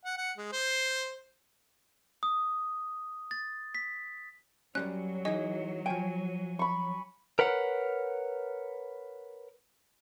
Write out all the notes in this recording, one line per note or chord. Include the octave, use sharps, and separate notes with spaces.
F#5
F#5
G#3
C5
D#6
A6
B6
F#2 F#3 G3 C#4 F#6
E3 D#4 G#4 D#5
F3 C#5 G5 G#5
B5 C#6
A#4 B4 C#5 F#5